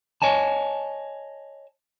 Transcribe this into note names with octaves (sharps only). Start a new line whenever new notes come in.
C#5 D#5 G#5 A5